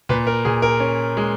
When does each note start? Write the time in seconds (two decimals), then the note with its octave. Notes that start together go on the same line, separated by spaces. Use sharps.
0.09 A#2 B4
0.27 A#4
0.45 A#2 G#4
0.62 A#4
0.80 C#4
1.17 G#3